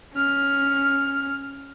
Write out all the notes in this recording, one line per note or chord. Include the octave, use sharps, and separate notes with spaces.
C#4 F6